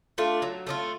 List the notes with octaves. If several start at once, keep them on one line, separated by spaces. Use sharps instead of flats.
A3 D4 F4
F#3
A3 D4 F4